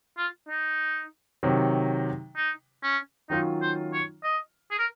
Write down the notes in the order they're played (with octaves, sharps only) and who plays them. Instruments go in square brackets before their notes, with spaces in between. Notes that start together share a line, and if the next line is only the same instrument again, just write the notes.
[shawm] F4
D#4
[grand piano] C3 D#3 F#3
[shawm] D#4
C#4
[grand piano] D#3 F#3 C#4 F4 [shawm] D#4
[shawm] C5
C#5
D#5
G#4
A#4